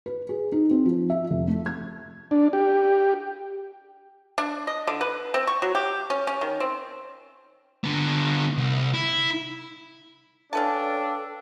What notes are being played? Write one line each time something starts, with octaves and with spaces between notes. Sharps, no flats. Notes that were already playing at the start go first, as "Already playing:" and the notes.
B4
G#4
D#4
C4
F3
E5
F1
A3
G#6
D4
G4
D4
D#5
D3
B4
C4
C#6
F#3
G4
C#4
C#4
D#3
C4
D3 B3
C2
E4
C#4 D4 A4 B4 F5 G5 A5